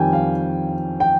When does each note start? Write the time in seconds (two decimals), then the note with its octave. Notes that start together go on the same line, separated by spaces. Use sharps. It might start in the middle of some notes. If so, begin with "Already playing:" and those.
Already playing: F2 D#3 G3 G5 G#5
0.13 F5
1.00 G5